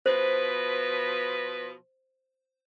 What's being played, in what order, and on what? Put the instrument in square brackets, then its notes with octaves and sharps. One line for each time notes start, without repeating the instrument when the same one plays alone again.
[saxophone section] B2 F3 B4 [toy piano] C5